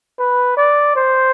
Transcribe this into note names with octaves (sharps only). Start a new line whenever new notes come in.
B4
D5
C5